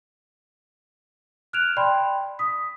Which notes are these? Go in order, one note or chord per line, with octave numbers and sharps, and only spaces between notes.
F6 F#6 G#6 D7 E7 F7
D5 G5 B5 C6
D#6 B6